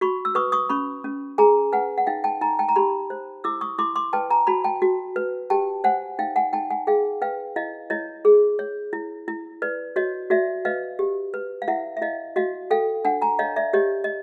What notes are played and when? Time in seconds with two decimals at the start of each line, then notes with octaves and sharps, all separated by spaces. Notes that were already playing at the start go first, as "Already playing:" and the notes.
0.01 F#4 B5 C#6
0.25 E6
0.35 B4 C#6 D#6
0.52 C#6 D#6
0.69 C#4 B5 C#6
1.04 C#4
1.38 G#4 G#5 A#5
1.73 B4 F#5 G#5
1.98 F#5
2.07 D#4 F5 G5
2.24 G5 A5
2.41 D#4 G#5 A#5
2.59 G5 A5
2.69 A#5
2.76 G4 A5 B5
3.10 C5
3.44 E4 D6 E6
3.61 C#6 D#6
3.78 E4 C6 D6
3.96 C6 D6
4.13 B4 G5 A5
4.30 G#5 A#5
4.47 F#4 A5 B5
4.64 G5 A5
4.82 F#4
5.16 B4
5.50 G4 G5 A5
5.84 C5 F#5 G#5
6.19 D#4 F5 G5
6.36 F#5 G#5
6.53 D#4 G5 A5
6.70 F#5 G#5
6.87 G#4 F5 G5
7.22 B4 F5 G5
7.56 E4 D#5 F5
7.90 E4 C#5 D#5
8.25 G#4
8.59 C#5
8.93 E4
9.28 E4
9.62 B4 D5
9.96 F#4 C#5 D#5
10.30 F#4 D5 E5
10.65 B4 D#5 F5
10.99 G4
11.34 B4
11.62 F5
11.68 E4 E5 F#5
11.97 E5
12.02 E4 D#5 F5
12.36 F#4 D#5 F5
12.71 A4 F5 G5
13.05 D4 F#5 G#5
13.22 G#5 A#5
13.39 C#5 D#5 F5
13.56 D5 E5
13.73 G4 C#5 D#5
14.04 D#5